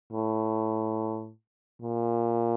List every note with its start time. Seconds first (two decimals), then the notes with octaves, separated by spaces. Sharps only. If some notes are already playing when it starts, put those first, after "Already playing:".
0.13 A2
1.82 A#2